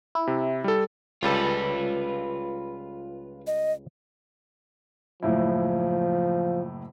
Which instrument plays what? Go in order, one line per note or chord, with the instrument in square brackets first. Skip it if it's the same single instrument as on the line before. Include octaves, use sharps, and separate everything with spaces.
[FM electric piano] E4
[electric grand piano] C3
G3 A4
[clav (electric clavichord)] C#2 G3 A4 [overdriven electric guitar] F4 B4
[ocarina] D#5
[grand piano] F#1 A2 E4 [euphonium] F3